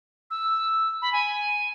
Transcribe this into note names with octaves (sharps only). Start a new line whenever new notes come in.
E6
B5
G#5